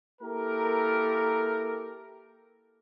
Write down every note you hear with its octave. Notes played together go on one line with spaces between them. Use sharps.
A#3 E4 G4 A4 A#4